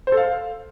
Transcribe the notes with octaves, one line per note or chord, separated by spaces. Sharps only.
C5
A4
F5